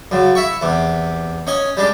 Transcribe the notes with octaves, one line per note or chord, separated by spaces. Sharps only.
F#2 C#3
E4 E5 C#6
E2 C3
C#4 D#5 G#5
G3 G#3 D4